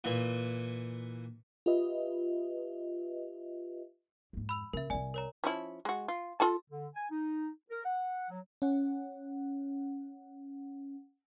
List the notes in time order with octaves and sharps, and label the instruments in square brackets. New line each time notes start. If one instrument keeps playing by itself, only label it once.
[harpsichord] A#2 E3
[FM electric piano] F4 G4 B4 D#5 E5
[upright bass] F2 G#2
[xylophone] B5 E6 F7
[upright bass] C#3 [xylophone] A#4 E5
[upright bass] C2 G3 [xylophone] D5 G#5
[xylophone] A#4 C#5 A#5
[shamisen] F3 C#4 E4
G#3 F#4
F4
F4 A4 A5
[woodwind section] D3
G#5
D#4
A#4
F#5
F#3
[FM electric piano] C#4 F#5